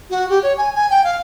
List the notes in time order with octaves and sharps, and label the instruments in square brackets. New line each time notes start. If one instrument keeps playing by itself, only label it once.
[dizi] F#4
G4
C#5
G#5
G#5
G5
F5